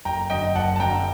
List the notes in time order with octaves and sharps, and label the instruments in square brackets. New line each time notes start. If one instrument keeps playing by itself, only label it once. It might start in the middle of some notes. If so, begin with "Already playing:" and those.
[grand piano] F#1 [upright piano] G5 A#5
[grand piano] F#2 D3 [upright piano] D#5 G5
[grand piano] F#1 [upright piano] F#5 A5
[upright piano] A5
[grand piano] F#2 D3 [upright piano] G5 A#5